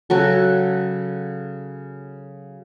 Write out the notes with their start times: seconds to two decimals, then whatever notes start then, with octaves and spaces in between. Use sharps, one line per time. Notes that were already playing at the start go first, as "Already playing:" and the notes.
0.10 C#3 F#3 F#4 A4